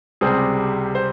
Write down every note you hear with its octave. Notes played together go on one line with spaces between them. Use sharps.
C#2 C3 G3 G#4 C5
C5